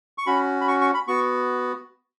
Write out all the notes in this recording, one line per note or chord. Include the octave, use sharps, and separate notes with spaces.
C#6
C#4 F#4 B5
B5
C#6
C#6
B5
B3 F#4 C#6